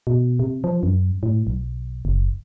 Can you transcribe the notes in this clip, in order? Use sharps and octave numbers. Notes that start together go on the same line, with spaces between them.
B2
C3
F3
F#2
A2
B1
F#1